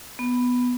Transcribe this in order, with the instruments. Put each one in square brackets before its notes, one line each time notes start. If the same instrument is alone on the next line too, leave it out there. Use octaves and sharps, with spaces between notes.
[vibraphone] B3